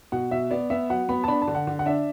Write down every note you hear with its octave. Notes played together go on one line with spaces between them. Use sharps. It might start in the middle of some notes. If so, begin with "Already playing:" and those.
B2 F#5
B2 E5
B3 D5
B3 E5
F#3 F#5
B3 B5
A5
D4 B5
A5
D3
F#5
D3
F#5
D4 E5